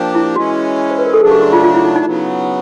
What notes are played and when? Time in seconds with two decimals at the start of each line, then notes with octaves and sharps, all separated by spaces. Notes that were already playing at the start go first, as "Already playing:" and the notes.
Already playing: A#2 F3 A#3 D4 G4
0.15 E4
0.36 E3 G#3 C#4 F#4
0.91 C5
0.99 B4
1.06 A#4
1.14 A4
1.21 C#3 F#3 A3 D4 G#4
1.31 G4
1.42 F#4
1.53 F4
1.63 F4
1.74 E4
1.85 D#4
1.96 D#4
2.05 C#3 F#3 B3